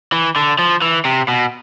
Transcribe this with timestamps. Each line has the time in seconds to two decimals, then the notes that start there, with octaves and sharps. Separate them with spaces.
0.12 E3
0.36 D3
0.59 F3
0.82 E3
1.05 C3
1.28 B2